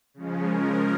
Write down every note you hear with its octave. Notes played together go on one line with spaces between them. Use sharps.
C#3 F3 G#3 C#4
A#4